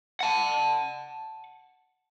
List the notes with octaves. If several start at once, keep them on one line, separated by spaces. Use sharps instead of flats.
F#5 A5